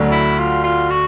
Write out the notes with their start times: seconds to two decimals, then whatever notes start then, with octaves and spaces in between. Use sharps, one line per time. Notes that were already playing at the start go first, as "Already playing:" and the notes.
Already playing: D2 D3 F#3
0.11 E4
0.38 F4
0.64 F4
0.90 F#4